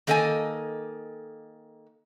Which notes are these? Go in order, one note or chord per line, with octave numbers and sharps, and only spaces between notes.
D#3 A#3 A4 D#5 E5 G#5